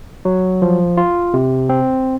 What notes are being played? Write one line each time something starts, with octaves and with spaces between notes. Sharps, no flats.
F#3
F3
F4
C3
C4